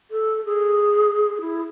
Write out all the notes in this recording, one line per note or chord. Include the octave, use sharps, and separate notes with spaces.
A4
G#4
E4